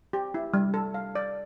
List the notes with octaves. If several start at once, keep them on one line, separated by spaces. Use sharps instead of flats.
G4
E4
G3
A4
F5
D5